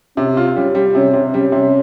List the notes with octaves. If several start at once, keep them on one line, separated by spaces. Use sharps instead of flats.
C3 C#4
F4
G3 C#4
G3
C3 C#4
C3
G3 C#4
C3